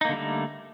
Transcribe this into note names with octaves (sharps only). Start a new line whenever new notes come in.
D3 G3 A3 A#3 D#4